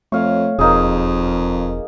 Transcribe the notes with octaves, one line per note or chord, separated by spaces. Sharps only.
F2 A3 C#5 F5
E1 F2 A#3 D#4 G#4